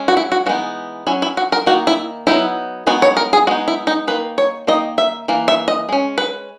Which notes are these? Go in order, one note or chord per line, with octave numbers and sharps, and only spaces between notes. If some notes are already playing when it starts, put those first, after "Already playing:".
Already playing: G#3 C#4
F#4
E4
F#4
E3 G#3 B3 D#4 F#4
F#3 C#4 E4
E4
F#4
A#4
D#3 A#3 D#4 F#4
E4
F#3 B3 D#4 E4
G#3 B3 D#4 F#4
C#5
A#4
G#4
G#3 B3 D#4 F#4
E4
D#4
D#3 A#3 D#4 B4
C#5
D#3 A#3 D#4 D#5
E5
E3 A#3
E5
D#5
G#3 C#4
B4